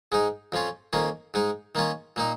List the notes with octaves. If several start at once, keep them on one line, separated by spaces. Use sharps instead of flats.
G#2 G#3 D#4
F2 F3 C#4 F4
F2 D#3 A#3 C#4
G#2 G#3 D#4
D#3 A#3 C#4 F4
A#2 A#3 D#4